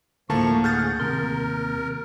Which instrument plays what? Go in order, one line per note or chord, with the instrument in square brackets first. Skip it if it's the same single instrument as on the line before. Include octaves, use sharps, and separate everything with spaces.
[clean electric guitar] D2 A2 [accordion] F3 C#6 [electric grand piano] A3 A#3 A5
[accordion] G#4 F#5 [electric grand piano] F6 G6 A6
[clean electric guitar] D#2 C3 C6 [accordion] A#4